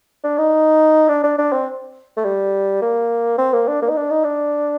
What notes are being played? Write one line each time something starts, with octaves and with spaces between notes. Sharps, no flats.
D4
D#4
D4
D4
D4
C4
A3
G3
A#3
C4
A#3
D4
A#3
D#4
D4
D#4
D4